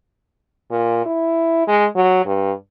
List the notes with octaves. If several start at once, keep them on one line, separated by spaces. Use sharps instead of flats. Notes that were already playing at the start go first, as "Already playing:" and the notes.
A#2
E4
G#3
F#3
G2